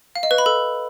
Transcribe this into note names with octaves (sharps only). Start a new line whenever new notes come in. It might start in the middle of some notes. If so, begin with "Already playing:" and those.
F5
D#5
B4
B5
A4